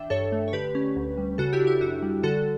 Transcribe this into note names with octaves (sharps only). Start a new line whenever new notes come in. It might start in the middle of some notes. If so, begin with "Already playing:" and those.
Already playing: E3 D4 E5 G5
G2 A4 C#5
A3
C#5
D3 G4 B4
C#4
D2
G3
C#3 F#4 A4
E4 G4
D4
E4
F#2 F#4
G3
D3 F#4 A4